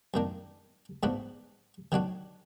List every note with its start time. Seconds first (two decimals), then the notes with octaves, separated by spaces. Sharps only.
0.14 F#2 D#3 A#3 D4
1.03 G#2 F3 B3 D4 F#4
1.92 D#3 F#3 D4 F#4